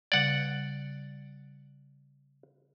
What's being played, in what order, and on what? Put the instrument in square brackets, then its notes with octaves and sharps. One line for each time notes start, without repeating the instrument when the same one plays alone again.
[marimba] C#3 G3 G#6 [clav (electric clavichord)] D5 F#5